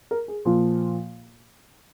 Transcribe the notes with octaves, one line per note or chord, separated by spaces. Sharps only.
A#4
G#4
A#2 F3 F4